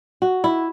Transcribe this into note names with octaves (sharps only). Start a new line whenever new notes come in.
F#4
E4